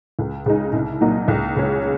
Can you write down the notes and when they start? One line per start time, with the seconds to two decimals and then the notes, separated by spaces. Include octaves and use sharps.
0.19 C#2
0.46 C#3 G#3 D#4
0.73 C2
1.01 A#2 F#3 A#3 D#4
1.28 C#2
1.56 C#3 G#3 C#4